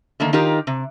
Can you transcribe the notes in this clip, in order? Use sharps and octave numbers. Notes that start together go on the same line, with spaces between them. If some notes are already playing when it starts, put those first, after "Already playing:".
D3 D#3 A3 A#3
D#3 D#4 F4 G4 A#4
C3